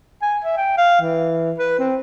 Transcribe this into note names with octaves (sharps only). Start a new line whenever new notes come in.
G#5
E5
G5
F5
E3
B4
C4